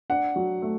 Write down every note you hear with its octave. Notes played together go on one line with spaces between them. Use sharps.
D4 F#5
F#3
A3